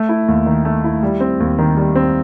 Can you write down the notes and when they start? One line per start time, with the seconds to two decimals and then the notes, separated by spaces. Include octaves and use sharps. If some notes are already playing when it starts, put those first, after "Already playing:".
Already playing: A3
0.09 E4
0.28 D#2
0.46 D#3
0.65 A3
0.84 E4
1.03 G3
1.20 C4
1.40 D#2
1.58 D#3
1.77 G3
1.95 C4